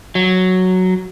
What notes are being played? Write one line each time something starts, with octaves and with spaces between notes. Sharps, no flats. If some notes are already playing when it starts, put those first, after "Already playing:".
F#3